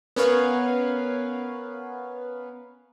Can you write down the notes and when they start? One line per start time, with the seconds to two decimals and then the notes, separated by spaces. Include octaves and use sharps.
0.16 B3 C#4 A#4 B4 C#5 F5